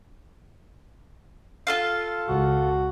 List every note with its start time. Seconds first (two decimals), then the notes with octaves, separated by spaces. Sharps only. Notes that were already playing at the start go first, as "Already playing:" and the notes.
1.67 F4 A4 F5
2.28 C#2 F#4